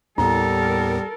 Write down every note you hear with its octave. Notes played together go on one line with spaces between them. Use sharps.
D#2 A2 G3 B3 E4 A4 A#4